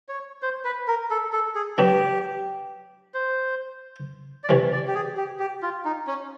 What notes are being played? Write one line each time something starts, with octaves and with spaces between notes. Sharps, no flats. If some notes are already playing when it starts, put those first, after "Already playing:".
C#5
C5
B4
A#4
A4
A4
G#4
F#3 B3 D4 G4
C5
D5
C3 E3 G3 C#5
D5
G4
G#4
G4
G4
F4
D#4
C#4